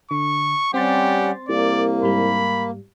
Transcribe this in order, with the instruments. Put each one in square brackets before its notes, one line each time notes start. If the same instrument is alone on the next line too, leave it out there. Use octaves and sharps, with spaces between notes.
[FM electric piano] D3 [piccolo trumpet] C#6
[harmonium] G3 C#4 F#5 [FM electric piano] C4 C6 A6 [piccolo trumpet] G4
[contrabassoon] C2 [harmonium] A#3 [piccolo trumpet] D5
[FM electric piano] G#2 G3 [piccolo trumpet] B5